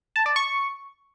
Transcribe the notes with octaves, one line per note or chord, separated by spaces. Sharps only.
A5
D5
C#6